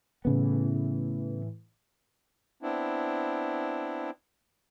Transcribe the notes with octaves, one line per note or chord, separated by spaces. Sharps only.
A2 C#3 E3 B3
B3 C4 D4 E4